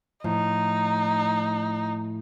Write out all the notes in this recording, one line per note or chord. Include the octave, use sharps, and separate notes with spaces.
A2 F3 D#4